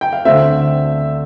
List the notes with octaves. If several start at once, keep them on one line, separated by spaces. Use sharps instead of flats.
G5
F5
D2 D3 A3 C4 C5 E5